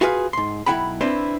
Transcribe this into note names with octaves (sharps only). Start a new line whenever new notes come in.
F4 F#4 G#4 B4 D5 F5
G#2 C6
B1 F3 E4 F#5 G5 B5
C4 D4 E4 B4 C5 D5